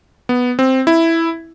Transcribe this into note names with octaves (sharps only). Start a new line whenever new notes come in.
B3
C4
E4